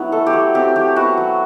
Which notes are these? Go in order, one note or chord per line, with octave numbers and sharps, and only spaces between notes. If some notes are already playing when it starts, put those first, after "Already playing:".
Already playing: F#3 B3 E4
A3 A4
G4
F#3
C4 G4
F#3 G4
B3 F#4
F#3